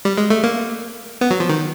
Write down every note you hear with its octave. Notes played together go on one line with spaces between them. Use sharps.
G3
G#3
A3
A#3
B3
F#3
F3
D#3